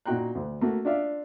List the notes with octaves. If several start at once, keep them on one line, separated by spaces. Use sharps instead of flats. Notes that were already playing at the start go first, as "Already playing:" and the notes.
A#2 D#4 F#4 G5 A#5 F#6
D2
A3 A#3 F#4
D4 F4 D5 E5 F5